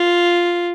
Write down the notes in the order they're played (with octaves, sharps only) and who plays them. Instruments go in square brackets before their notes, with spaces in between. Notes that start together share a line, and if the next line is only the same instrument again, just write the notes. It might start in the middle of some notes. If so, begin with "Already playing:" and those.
Already playing: [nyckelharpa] F4